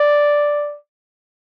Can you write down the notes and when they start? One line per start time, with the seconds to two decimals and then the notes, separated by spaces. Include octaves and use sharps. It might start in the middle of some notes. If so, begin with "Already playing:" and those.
Already playing: D5